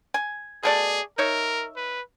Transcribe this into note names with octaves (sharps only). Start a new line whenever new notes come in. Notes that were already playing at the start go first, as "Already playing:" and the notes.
G#5
B2 A3 G#4 D5
D#4 A#4 C#5 E5
B4